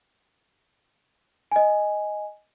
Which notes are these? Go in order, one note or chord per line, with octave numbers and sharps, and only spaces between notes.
D#5 G#5